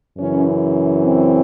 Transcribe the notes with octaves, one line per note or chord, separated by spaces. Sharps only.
F#2 C#3 E3 C#4
C4